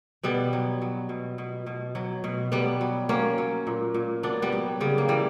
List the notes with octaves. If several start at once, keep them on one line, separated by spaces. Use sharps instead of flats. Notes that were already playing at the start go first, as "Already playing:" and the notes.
B2 G3 B3
F#3
F#3
B2
B2
B2
F#3
B2
F#3 G3 B3
F#3
F#3 A#3 C#4
F#3
A#2
A#2
F#3 B3 D4
G3 B3
F#3
C#3 G3
A#3
E3 G3